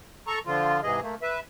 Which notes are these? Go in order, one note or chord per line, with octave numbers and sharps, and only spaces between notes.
A4 A#5 C#6
D3 F3 F4
G#2 C3 E3 G#4 D#5
A3 A#3
B4 E5